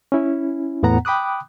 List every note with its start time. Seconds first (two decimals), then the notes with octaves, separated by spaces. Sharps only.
0.12 C#4 E4
0.83 E2 A2 B3 F#5 A#5
1.05 G5 B5 D6 D#6 F#6